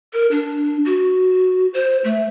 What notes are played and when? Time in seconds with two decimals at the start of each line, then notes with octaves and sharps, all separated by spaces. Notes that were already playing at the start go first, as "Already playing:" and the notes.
0.13 A#4
0.31 D4
0.85 F#4
1.74 C5
2.04 A3